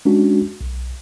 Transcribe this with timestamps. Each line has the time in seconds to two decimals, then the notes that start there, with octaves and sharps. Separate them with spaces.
0.05 G#3 C#4 D4 F#4
0.61 B1